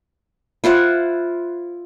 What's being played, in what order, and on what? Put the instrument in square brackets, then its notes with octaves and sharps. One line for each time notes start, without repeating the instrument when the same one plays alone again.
[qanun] E4 F4 C5 F#5